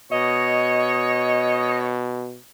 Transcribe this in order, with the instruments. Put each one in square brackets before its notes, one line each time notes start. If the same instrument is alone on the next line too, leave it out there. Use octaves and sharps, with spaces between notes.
[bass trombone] B2 [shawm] C#5 [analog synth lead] D#5